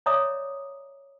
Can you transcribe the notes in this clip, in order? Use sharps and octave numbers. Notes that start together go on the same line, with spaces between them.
C#5 D5 E5 A#5 D6 D#6